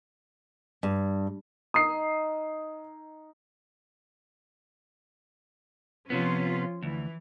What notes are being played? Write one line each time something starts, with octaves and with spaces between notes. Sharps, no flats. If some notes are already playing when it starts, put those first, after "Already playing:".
G2
D#4 D#6 C7
C3 F3 B3 C#4 F4
D2 E3